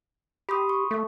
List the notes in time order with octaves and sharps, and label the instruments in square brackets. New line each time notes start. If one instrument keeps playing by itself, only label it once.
[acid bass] G4 [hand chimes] B5 C6 D#6
[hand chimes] C#6
[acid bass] A3 [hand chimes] A4 E5